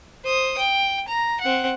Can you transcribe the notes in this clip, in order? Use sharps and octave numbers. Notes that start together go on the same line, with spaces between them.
C5 D#6
G5
A#5
C4 F#5